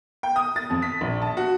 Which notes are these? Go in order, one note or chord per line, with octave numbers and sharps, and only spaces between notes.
G5
D#6
A6
F2
B6
A#1
A5
F#4